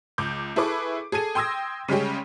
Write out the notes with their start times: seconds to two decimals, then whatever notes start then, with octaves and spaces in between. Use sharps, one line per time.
0.18 C#2 D6 G6
0.56 E4 G#4 A4 B4 C#6 D6
1.12 G#4 A4 G#6 D#7
1.35 G5 C6 D#6 E6 G#6 A#6
1.88 C#3 G3 G#3 C#4 G4